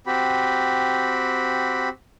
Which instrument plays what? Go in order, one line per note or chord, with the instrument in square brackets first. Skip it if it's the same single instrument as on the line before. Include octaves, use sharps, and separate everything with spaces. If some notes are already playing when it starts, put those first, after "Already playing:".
[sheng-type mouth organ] C4 F#4 G4 B5